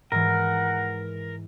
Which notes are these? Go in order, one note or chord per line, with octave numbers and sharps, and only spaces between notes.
G#2 E3 A#4 F#5